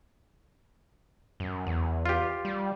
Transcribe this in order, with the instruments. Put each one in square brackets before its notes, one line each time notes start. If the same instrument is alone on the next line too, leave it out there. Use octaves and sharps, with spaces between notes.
[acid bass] F#2
E2
[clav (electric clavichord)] F4 G4
[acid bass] G3